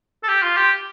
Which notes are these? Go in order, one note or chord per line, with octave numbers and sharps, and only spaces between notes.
A4
G4
F4
G4